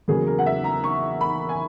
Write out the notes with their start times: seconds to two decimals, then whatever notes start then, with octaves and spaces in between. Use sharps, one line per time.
0.08 E2 C#3 F#3 A#3 G#4
0.27 A#4
0.39 F#5
0.46 E5
0.64 A#5
0.84 C#6
1.21 B5
1.49 G#5